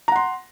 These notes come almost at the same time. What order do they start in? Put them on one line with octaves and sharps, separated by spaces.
A#5 F#5 C6